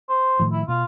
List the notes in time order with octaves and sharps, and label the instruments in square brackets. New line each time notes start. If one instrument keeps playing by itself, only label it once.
[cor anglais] C5
[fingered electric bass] A2 D#3 F3
[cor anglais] E4
[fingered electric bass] B2 B3 [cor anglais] F4